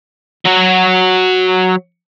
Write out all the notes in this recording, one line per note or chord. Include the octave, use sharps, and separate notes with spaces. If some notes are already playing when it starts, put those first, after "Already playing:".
F#3 F#4